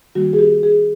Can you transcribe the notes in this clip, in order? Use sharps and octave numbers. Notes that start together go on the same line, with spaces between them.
D#3 G3 A#3 F#4
G#4
G4
G#4